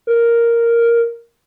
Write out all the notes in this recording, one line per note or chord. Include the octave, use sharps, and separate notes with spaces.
A#4